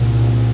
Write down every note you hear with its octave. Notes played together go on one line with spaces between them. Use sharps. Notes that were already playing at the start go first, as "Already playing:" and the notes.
Already playing: C2 A#2